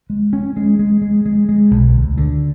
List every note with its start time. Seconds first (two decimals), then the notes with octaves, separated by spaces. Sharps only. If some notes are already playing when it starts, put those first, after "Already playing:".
0.10 G#3
0.33 C#4
0.57 G#3
0.79 G#3
1.02 G#3
1.26 G#3
1.49 G#3
1.71 B1
1.95 D2
2.17 D3